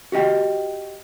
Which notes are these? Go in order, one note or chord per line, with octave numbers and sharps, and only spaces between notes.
F#4 G4 D#5 G5